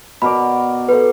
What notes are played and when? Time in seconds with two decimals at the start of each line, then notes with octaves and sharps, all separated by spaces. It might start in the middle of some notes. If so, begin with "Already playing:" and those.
0.22 B2 A#4 D5 B5
0.89 A4 B4 C5 F#5